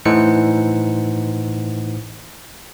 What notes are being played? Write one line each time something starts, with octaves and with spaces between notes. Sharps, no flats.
A2 E3 D#4 C5 F#5 C#7